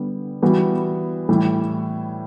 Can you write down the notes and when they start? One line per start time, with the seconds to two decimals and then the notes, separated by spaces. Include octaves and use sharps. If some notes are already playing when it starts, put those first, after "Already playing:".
Already playing: D3 G3 B3
0.42 E3 G3 B3 F#4
1.29 A2 E3 G3